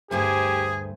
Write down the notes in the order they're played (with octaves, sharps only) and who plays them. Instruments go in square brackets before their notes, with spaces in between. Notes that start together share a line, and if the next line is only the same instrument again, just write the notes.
[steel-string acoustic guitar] D2 G2 A3 [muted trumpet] G4 [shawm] G#4 [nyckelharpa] C5 G#5